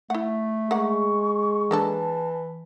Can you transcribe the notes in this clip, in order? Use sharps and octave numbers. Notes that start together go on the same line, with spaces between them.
A3 E4 F#5
G#3 A#3 F#5 C#6
E3 A#3 D4 A4 A5